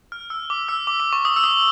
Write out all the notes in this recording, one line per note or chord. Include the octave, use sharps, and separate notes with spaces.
F6
E6
D6
E6
D6
D6
C#6
D#6
E6
D#6